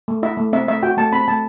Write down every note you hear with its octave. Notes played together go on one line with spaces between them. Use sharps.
A3
E4 E5
A3
C4 E5
A3 E5
F#4 G5
A3 A5
C4 B5
A3 A5